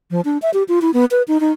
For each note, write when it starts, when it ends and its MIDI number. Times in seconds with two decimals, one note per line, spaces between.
0.11 0.21 53
0.25 0.38 62
0.42 0.50 76
0.54 0.63 67
0.69 0.79 65
0.82 0.91 64
0.94 1.05 59
1.11 1.22 71
1.28 1.40 63
1.40 1.52 63